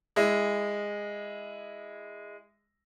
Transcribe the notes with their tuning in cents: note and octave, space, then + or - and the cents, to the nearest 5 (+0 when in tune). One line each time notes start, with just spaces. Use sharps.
G#3 -15 E4 +0